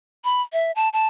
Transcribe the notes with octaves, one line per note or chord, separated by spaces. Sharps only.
B5
E5
A5
A5